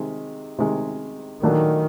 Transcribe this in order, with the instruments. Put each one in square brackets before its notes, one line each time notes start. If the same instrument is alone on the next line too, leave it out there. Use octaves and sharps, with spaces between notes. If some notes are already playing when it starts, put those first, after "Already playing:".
Already playing: [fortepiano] C3 D#3 G#3
C3 D#3 G#3
[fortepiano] A#2 F#3 A3 D4 [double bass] D#3